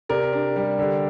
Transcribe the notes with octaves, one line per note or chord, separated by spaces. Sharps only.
C3 A#4 D5
D4
G3
D3